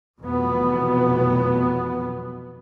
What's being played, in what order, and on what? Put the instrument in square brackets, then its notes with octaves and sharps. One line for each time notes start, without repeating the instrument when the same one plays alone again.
[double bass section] F1 B2 E3 F#3 B3